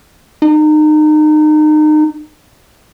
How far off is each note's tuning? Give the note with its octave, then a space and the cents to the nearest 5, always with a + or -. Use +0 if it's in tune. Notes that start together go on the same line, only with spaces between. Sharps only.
D#4 -30